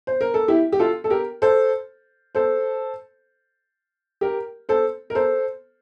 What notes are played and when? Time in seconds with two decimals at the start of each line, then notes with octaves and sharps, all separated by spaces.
0.07 C5
0.21 A#4
0.34 A4
0.48 E4 G4
0.72 G4
0.79 F4 A4
1.04 A4
1.10 G4 A#4
1.42 A4 C5
2.35 A4 C5
4.21 G4 A#4
4.69 A4 C5
5.10 A#4
5.15 A4 C5